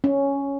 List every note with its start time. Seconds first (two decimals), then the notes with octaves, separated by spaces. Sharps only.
0.04 C#4